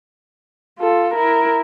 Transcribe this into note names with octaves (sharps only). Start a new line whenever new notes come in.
F4 A4
E4 A#4